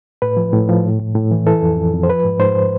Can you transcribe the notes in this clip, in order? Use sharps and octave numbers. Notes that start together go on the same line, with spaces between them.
A2 B4
F3
A2
F3
A2
A2
A2
E3
E3 A4
F2
F2
F2
C5
F3 B4
G#2
G#2 C5